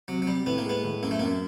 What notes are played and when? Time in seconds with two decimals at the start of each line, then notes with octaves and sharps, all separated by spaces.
0.08 C3 F#3
0.22 F#3
0.27 C3 G3
0.46 A2 B3
0.58 A#3
0.65 G#3 B3
0.84 A2
1.03 F#2 A#3
1.11 A3
1.19 F#2 A#3